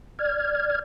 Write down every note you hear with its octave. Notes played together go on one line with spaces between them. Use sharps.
D5 F6 G#6